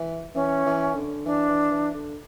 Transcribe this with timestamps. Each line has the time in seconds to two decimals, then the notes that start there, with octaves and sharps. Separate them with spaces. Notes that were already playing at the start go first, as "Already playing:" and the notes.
Already playing: E3
0.35 E3 C#4
0.66 E3
0.95 D3
1.25 E3 D4
1.49 E3
1.71 E3
1.94 D3